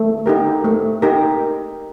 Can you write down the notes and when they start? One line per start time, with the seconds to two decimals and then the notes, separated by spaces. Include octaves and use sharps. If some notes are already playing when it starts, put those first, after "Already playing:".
Already playing: A3
0.26 D#4 G4 A#4
0.65 A3
1.02 D#4 G4 A#4